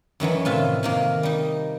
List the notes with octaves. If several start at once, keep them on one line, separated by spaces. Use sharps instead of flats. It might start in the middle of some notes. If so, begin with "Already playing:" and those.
F#2 D#3 E3 F#3
A2 C3 F4 E5
C3 D#3 A#3
G3 D#4